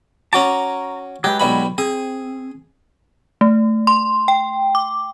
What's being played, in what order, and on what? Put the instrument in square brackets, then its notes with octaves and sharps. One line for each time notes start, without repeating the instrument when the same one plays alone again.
[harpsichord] C#4 F#4 D6 [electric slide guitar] A5 A#5
[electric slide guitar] F#3 G#3 B4 [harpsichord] G4
[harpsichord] B1 G3 B5
[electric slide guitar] C4 [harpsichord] G#4
[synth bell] A3
C6
G5
D6